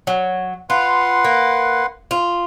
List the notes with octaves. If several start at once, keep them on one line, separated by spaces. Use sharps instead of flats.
F#3
F4 B4 F#5 C6
A#3
F4